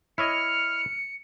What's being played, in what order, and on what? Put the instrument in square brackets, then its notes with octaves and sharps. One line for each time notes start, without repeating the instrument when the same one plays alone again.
[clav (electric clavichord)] E4 C#5 D#5 [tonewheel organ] F6 [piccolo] C#7